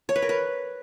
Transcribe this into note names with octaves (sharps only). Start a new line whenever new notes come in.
C#5
B4
A#4
B4